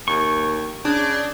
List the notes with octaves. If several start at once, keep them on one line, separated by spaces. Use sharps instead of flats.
D#2 C#6
C#3 D4